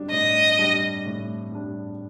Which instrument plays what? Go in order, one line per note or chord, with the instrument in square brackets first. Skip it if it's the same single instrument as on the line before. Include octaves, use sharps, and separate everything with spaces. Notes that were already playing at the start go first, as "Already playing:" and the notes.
Already playing: [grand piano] G3 D4
[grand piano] A2 [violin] D#5
[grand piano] G3 D4
A2
G3 D4